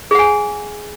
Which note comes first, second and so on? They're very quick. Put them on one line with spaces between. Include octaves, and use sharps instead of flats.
G#4 F#5 G#5